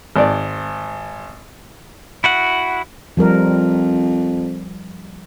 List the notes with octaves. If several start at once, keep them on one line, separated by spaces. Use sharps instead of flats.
G#1 D5
E4 F#4 F#5
F2 F3 G3 A#4